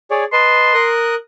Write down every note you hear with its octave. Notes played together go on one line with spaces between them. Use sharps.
G#4 C#5 D5
B4 D#5 A5 C6
A#4 D#6 F#6